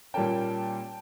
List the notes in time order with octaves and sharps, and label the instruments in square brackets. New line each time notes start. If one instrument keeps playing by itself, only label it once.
[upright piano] A#2 G3 A#3 C#4 G5 A5